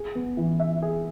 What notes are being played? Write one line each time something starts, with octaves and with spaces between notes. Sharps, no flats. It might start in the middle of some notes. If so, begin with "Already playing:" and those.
Already playing: G#4
B3
E3
E5
G#4